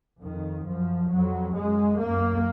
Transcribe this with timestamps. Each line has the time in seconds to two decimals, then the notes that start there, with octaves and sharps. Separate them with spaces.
0.21 F2 D#3
0.65 F#2 F3
1.10 F2 F#3
1.55 F#2 G#3
2.00 F#2 A#3